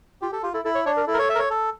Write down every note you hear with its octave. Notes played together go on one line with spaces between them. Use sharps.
F4 G4
G4 A4
F4 G4
E4 A4
E4 A4
C#5
D4 C#5
A#4
E4 A4
A#4
C#5
E5
A#4
C#5
A4